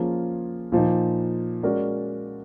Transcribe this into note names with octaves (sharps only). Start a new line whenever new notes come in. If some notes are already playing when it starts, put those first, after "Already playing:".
Already playing: F3 A#3 C#4 F4 G#4
A#2 F3 A#3 D#4
G#3 C#4 F#4 A#4 D5